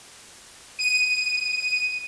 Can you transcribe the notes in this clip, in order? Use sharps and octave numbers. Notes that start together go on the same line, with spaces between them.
D#7